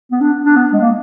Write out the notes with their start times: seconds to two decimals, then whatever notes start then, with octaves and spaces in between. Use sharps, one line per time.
0.11 B3
0.21 D4
0.45 D4
0.56 B3
0.73 G#3
0.81 A#3